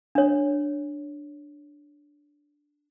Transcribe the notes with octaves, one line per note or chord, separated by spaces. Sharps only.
D4 C#5